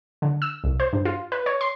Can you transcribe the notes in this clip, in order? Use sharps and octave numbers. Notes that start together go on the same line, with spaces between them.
D3
E6
C2
C5
G2
F4
B4
C#5
C6